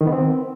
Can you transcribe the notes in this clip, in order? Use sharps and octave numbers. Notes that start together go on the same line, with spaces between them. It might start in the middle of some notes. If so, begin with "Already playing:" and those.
D#3
B3
C4